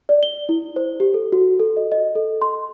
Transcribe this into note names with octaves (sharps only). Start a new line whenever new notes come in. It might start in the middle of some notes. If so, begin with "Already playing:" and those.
D5
G7
E4
C5
G4
A4
F#4
A4
D#5
D#5
A4
C6